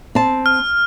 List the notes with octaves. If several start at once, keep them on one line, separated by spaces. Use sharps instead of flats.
C4 A5
F6